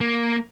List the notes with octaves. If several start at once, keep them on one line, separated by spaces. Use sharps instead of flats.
A#3